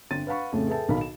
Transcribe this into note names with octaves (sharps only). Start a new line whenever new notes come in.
G1 C4 C5 A6 D#7
B4 F5 F#5 B5 C#6
F2 A2 C#3 A3
G#4 A4 B4 E5 G5 A5
B1 D#3 A#4 F5 B5
E7